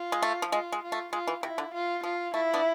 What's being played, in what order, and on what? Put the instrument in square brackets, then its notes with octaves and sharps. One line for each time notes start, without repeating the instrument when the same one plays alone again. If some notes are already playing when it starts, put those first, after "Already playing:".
Already playing: [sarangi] F4
[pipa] G#3
A3
F3
[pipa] G#3 [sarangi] F4
[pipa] G#3
[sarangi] F4
[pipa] A3
[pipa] G#3 [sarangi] F4
[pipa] E3
[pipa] C3 [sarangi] E4
[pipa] D3
[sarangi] F4
[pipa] F3 [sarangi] F4
[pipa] A3 [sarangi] E4
[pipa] B3 D4